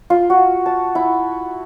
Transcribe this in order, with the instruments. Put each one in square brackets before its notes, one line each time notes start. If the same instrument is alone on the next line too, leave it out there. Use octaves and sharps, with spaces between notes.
[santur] F4
F#4
A5
E4